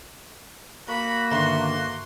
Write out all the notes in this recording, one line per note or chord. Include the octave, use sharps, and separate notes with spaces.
A#3 F#4 B5
G2 D3 D#3 B3 E5 C6